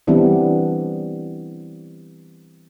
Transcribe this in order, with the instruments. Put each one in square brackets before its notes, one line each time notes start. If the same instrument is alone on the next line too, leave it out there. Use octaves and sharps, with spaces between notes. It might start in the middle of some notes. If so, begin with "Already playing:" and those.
[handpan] E3 G3 B3 C4 D4 E4